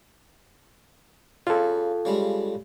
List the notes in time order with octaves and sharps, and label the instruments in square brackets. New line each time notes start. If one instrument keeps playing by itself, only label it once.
[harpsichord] C#3 [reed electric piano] F4 A4
[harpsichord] C#3 G3 G#3